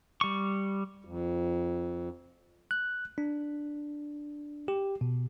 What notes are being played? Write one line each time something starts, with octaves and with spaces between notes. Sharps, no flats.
G3 C#6
F2
F#6
D4
G4
B2